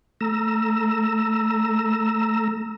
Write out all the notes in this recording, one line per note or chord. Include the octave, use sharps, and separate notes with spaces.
A3 A#5 E6